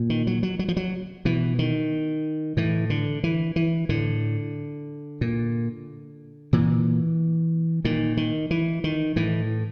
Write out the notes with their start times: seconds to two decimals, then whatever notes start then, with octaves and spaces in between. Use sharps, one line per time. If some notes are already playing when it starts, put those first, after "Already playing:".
Already playing: A#2
0.10 D#3
0.27 F#3
0.43 F#3
0.59 F#3
0.68 F3
0.77 F#3
1.25 B2 E3
1.59 D#3
2.57 A2 E3
2.90 D3
3.24 E3
3.56 E3
3.89 A2 D3
5.21 A#2
6.53 A#2 E3
7.85 A#2 D#3
8.17 D#3
8.51 E3
8.84 D#3
9.16 A2 E3